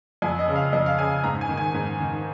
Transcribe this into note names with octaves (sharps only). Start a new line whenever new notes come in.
F2 G#5
D#5
C#3
F5
F2 D#5
F5
C#3 G#5
G#2 A#5
G#5
D#3
G#5
G#2
D#3